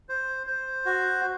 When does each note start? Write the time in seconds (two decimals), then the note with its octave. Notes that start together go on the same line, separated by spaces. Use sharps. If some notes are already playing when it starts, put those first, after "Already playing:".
0.09 C5
0.47 C5
0.86 F#4